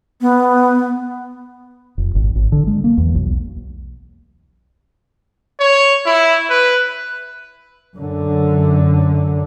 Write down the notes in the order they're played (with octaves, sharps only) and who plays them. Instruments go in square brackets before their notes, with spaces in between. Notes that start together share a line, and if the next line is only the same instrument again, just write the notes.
[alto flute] B3
[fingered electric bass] F1
G#1
G#1
D3
G#3
A#3
E2
B1
[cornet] C#5
E4
B4
[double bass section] F#2 D3